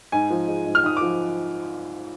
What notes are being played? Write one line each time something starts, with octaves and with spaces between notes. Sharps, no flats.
G#2 G#5
F3
G#3
G#2
F6
G#2 D#6
F3 D6